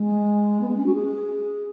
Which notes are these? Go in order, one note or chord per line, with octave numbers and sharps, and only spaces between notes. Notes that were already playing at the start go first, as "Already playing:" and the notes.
Already playing: G#3
B3
G#3
C#4
F#4
G#4